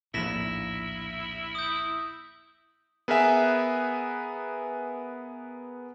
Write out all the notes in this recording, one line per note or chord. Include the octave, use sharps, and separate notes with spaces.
A#1 D#2 A2 E4 A#6 B6 E7
D#6 G6
B3 G#4 A#4 B4 E5 G#5